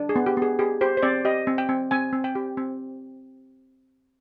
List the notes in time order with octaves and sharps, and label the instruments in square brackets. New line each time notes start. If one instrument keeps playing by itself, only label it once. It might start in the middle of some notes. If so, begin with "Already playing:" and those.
Already playing: [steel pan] D4
G#4
B3
G4
B3
G#4
G4 G#4
G4 C5
C5
C4 D5
G4 D#5
C4
G5
C4
C4 G#5
C4
G5
G4
C4